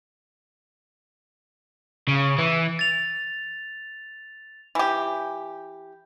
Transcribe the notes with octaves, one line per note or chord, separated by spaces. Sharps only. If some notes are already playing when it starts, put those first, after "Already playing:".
C#3
E3
A6 F7
E3 G4